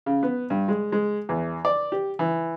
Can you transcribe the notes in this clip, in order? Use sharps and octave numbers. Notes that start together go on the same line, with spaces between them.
C#3
B3
G2
G#3
G#3
E2
D5
G4
E3